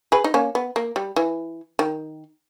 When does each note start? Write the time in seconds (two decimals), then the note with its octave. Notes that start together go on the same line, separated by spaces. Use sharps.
0.12 G#4 B4
0.24 D#4
0.34 A#3 C#4
0.55 B3
0.76 A#3
0.96 G3
1.16 E3
1.79 D#3